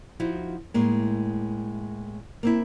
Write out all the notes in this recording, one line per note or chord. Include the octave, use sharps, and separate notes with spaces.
F3 D#4 E4 F#4
A2 G#3 A#3
A#3 C4 E4